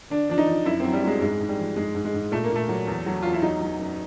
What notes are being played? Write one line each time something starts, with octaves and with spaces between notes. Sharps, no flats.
D3 D4
F3 D4
D#4
F3
F#2 E4
F#3 C4
G3
F#3 G#3
G#2 G#3
G#2
G3
F3
G#2 G#3
G#2
G#3
G#2
A#2 A3
A#3
A#2
A3
F#3
E2
F#3
E2 F4
E4
F#3 D#4
F#3
F#2